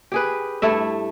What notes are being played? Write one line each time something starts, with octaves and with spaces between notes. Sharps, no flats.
G4 G#4 B4
G2 A3 E4 E5